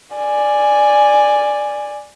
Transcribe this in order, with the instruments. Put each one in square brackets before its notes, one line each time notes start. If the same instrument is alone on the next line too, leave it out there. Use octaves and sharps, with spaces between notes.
[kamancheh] D5 G#5